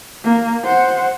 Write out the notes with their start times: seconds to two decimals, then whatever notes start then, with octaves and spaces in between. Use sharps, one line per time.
0.24 A#3
0.65 C5 F#5